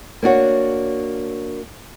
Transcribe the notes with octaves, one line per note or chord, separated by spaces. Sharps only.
A#3 D4 F#4 C#5